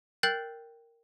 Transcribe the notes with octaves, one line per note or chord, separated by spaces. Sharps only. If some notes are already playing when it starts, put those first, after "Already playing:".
A#4 G5 F#6 G6 A6 C7